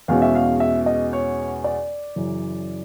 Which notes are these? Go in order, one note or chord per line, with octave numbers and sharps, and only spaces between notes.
E2 B2 G#3 C#4 F5
E5
F5
E5
D#5
C#5
D5
F#2 C#3 E3